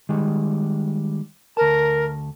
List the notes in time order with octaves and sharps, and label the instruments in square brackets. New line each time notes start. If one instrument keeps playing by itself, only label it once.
[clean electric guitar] D#3 G3 G#3
[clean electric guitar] D2 A5 [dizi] A#4